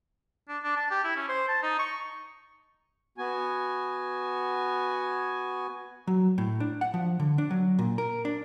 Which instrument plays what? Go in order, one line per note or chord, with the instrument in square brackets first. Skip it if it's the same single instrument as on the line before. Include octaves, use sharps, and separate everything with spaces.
[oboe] D4
D4
A5
G4
E4
C#4
C5
A5
D#4
C#6
[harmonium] B3 F#4 G#5
[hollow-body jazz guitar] F#3
A2
D4
F#5
F3
D3
D4
F#3
A#2
A#4
D4